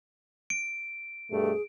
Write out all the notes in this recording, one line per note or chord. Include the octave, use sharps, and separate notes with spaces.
D7
G2 B2 A3 G#4